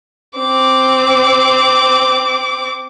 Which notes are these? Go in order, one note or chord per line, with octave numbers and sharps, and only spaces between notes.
C4 D6